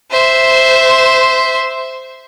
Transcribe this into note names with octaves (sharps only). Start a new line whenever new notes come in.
C5 E5